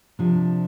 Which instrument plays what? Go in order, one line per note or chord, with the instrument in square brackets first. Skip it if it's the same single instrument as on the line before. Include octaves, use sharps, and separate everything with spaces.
[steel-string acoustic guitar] C3 F3 D4